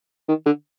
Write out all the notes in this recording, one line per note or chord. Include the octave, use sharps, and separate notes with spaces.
D#3
D3